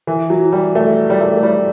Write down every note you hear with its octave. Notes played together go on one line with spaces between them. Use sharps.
E3
F#3
G3
A3
G3
A3
A3
G3